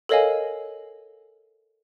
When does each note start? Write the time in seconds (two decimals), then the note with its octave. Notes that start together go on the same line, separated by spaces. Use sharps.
0.09 A4 A#4 C#5 D#5 F5 G#5